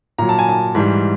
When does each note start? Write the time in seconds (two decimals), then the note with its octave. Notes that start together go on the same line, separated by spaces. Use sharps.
0.18 A#2 F#3 A#5
0.29 A5
0.39 G#5
0.49 A5
0.75 G#2 E3 G3